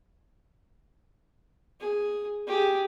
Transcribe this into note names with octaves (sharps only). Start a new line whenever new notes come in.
G#4
G4 G#4